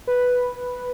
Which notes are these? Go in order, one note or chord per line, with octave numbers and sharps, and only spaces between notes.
B4